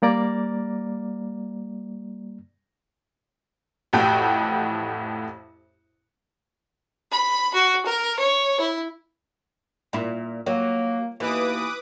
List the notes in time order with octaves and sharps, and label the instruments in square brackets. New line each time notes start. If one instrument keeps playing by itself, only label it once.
[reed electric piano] G3 A#3 D5 A#5
[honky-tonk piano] A1 F2 A2 F#4 G4 G5
[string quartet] B5
F#4
A#4
C#5
E4
[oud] A#2 E4
[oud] F#3 [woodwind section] A#3
[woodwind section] D#2 B2 A#3 [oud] E3 [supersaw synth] B4 D6 D#6